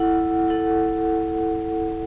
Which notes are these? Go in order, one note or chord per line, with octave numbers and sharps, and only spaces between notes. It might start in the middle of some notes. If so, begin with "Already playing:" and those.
Already playing: E4 A4 F#5
E4 A4 F#5